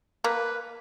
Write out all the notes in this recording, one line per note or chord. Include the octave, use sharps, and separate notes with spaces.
A#3 B4